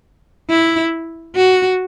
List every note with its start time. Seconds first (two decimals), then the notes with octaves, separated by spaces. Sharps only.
0.50 E4
1.36 F#4